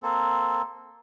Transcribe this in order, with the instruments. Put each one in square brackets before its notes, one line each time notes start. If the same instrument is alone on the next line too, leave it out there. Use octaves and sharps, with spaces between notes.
[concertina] A#3 C4 A4